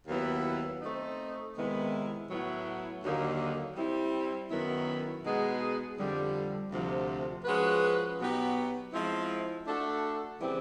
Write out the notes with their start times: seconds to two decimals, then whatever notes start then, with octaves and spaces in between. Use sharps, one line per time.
0.08 D#2 D#3 F#3 B3 E4
0.81 A3 C4 D#4
1.56 C3 D#3 G#3 B3 E4
2.29 A2 F#3 B3 E4
3.03 D#2 D3 F#3 A#3 D#4
3.76 G3 C4 E4
4.51 F#2 D#3 F#3 B3 E4
5.24 B2 G#3 B3 D#4 G#4
5.98 F2 D3 G3
6.71 D2 C3 F3
7.45 F3 G#3 C#4 F#4 B4
8.18 B2 F#3 B3 D#4 G4
8.93 F3 G#3 C4 E4
9.66 A3 D4 F#4 A4
10.40 C#3 E3 G3 C4 E4